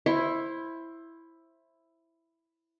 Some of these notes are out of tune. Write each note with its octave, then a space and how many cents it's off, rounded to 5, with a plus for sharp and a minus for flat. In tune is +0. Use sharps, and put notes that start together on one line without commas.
E4 +5 C5 +20 C#6 +0